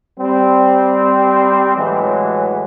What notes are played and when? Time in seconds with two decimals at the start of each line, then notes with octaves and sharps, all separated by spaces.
0.19 G3 C4
1.76 A2 E3 F#3 G#3